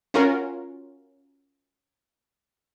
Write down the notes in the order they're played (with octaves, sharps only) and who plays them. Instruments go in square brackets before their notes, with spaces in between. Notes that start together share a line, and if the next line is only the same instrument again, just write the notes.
[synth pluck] C#4 F4 F#4 A#4